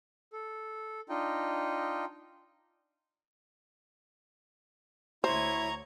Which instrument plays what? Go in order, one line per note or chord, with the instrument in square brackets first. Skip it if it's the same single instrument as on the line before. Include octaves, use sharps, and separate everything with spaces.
[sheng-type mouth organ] A4
D4 D#4 F4 D#5 G5
[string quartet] D2 C#5 G#6 [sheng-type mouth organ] E4 [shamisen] C5 [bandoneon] A#5